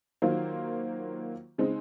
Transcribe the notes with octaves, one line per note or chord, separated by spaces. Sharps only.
D#3 F#3 A#3 F4 C5
C#3 G#3 C4 D#4